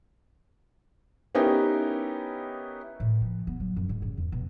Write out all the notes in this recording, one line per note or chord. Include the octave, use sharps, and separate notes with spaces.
B3 C#4 D#4 E4 G4 A#4
A2
F3
B3
F#3
F#2
G#2
C#3
E2
B2